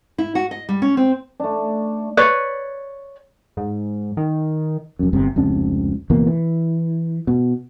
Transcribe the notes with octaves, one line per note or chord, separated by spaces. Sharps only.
E4
F#4
D#5
G3
C#4
C4
A3 D4
B4 C#5 D5
G#2
D#3
F1 F#2
G1 G2 C3
F1 C#2 C3 D4
C#2 B2 E3 A#3
E3
B2